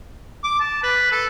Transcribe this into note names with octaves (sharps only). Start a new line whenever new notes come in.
D6
A5
B4
A4